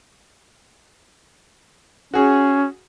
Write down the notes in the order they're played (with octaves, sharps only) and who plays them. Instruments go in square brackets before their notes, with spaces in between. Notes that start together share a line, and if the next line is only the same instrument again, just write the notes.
[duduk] C#4 [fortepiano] F#4 G#4